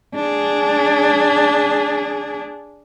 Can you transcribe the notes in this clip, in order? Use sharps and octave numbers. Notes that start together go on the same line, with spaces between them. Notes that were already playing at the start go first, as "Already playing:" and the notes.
D4 G#4